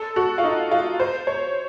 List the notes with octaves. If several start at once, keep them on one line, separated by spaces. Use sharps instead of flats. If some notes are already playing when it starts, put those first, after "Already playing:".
Already playing: A4
F#4
F4
D#4
F4
C5
C#5